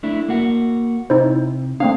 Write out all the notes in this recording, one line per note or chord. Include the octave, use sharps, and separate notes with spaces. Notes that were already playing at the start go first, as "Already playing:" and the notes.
A3 D4 E4
A#3 F#4
C3 D#4 E4 C5
A3 C4 D4 F5